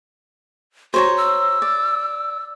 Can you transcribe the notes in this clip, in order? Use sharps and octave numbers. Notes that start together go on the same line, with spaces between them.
F#4 C5 C#5 A#5
E6
D5